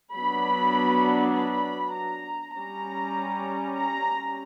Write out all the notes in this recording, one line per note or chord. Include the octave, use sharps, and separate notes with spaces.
F#3 B3 D4 B5
B5
A#5
G3 C#4 A#5
A#5